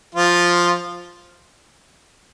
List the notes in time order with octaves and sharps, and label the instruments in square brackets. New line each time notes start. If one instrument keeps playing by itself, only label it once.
[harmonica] F3 F4